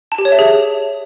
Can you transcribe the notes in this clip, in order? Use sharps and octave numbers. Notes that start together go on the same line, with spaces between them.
A5
G4
C#5
E5
G#4